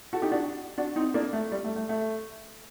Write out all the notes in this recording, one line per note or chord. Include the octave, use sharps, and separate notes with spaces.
F#4 A4
D#4 G4
D4 F#4
D4 F#4
C4 D#4
A#3 D4
A3
G3
A3
A3
A3